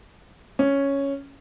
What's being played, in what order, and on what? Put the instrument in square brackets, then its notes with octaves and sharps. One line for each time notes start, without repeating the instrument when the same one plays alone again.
[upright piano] C#4